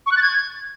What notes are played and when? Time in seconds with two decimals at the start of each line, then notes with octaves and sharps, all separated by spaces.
0.06 C#6
0.12 F#6
0.17 A6
0.22 G#6